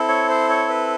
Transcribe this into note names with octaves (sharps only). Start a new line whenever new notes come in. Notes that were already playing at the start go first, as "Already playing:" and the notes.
Already playing: C4 E4 A4
C#5
C5
C#5
B4